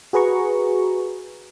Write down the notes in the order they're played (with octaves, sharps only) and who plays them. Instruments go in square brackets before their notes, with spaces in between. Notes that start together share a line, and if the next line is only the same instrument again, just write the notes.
[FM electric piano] F#4 G#4 B4 A#5 C#6